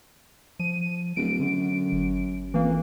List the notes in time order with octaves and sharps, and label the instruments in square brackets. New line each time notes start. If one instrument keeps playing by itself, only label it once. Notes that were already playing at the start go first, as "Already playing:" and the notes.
[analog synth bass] F3 [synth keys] D#7
[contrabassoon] D1 [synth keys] D7
[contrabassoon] F#2 [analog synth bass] D3
[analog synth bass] G1
[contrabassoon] F2 [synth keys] E3 A#3